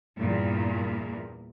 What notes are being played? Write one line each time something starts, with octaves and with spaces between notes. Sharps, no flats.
E2 G2 A#2